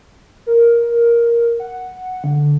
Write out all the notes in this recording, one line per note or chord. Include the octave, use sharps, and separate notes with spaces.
A#4
F#5
D3